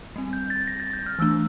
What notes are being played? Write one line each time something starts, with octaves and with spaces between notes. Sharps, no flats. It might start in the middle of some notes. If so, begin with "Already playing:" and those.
G3 C4
G6
A6
A#6
A6
G6
F6
E3 A3 D4 E6